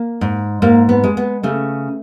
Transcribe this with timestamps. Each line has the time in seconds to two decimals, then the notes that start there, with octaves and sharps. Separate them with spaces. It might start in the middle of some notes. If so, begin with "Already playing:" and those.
Already playing: A#3
0.21 G#2
0.62 G#2 A#3
0.89 B3
1.04 G#3
1.17 B3
1.43 C#3 A3